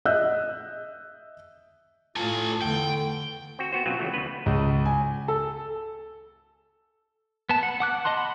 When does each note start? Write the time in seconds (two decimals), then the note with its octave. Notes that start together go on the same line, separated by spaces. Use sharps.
0.05 D#5 E5 E6 F#6 G6
2.16 A2 A3 F4 A4 G#5
2.62 E2 D3 A3 G5
3.59 C4 F#4
3.73 B3 F#4 C5
3.86 B2 F#3 C4 C#4 F4 F#4
3.99 C#3 E3 A3
4.14 D2 B3 B4
4.46 C#2
4.86 G#5
5.28 A4
7.49 B3 A5
7.63 F#5
7.80 F#5 D6 F#6
8.05 D#5 F#5 A5 C6
8.17 B5